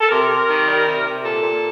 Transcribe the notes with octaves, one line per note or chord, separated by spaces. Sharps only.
A4
C3 A#4
C3
D#3
G3
C3
C3
A#2 A4
A#2